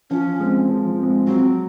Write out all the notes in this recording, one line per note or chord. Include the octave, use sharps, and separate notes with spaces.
F3 C#4
G#3 C4
F3
G#3 C4
F#3 C4